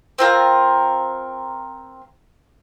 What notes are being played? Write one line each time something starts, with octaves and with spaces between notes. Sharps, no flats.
C4 F4 A#4